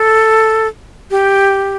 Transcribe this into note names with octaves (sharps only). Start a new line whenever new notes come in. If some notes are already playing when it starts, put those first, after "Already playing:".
Already playing: A4
G4